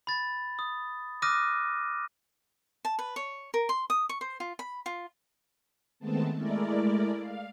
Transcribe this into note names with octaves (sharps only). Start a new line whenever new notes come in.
B5 A6
D#6
D6 D#6 F6 F#6 A#6 D#7
A5
B4
C#5
A#4
C6
D#6
C#6
C5
F4
B5
F4
D#3 G#3 A3 B3 C4 A5
G#3 A3 E4 A#4 D5
F5